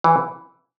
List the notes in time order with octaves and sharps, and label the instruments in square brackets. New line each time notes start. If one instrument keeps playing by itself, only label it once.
[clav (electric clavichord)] E3